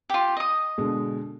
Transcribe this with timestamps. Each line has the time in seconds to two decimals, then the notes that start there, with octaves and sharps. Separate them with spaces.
0.10 F4 G4
0.37 D#5 D#6
0.78 B2 D3 G#3